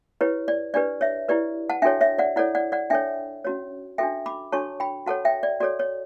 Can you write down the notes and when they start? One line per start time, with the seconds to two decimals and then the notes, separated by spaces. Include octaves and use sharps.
0.21 E4 G4 B4 C#5
0.48 D5
0.74 D4 G4 B4 D5
1.01 C#5 E5
1.29 E4 G4 B4 D5
1.70 F#5 A5
1.82 D4 F#4 A4 C#5 E5 G5
2.01 C#5 E5
2.18 D5 F#5
2.36 E4 A4 C#5 D5 F#5
2.55 D5 F#5
2.72 D5 F#5
2.90 D4 A4 C#5 E5 G5
3.45 C#4 F#4 C#5
3.98 D4 F#4 A4 E5 G5
4.26 B5 D6
4.52 D4 F#4 A4 C#5 A5 C#6
4.80 G5 B5
5.06 F#4 A4 C#5 F#5 A5
5.25 E5 G5
5.43 D5
5.60 F#4 A4 C#5 D5
5.79 C#5